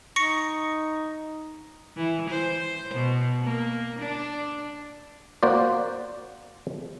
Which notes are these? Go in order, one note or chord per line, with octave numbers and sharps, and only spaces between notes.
D#4 C#6 A#6 C#7
E3
C5
B2
A#3
D4
A#3 F#4 C5 D5